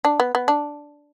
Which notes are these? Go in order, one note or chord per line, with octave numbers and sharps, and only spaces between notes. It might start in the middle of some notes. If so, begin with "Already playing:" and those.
D4
B3
B3
D4